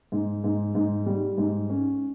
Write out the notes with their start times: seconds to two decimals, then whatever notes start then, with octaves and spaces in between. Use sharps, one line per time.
0.12 G#2
0.44 G#2
0.75 G#2
1.06 G3
1.38 G#2
1.70 C#4